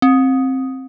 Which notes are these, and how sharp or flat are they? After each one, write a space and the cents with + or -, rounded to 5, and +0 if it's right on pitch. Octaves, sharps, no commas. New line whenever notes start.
C4 +15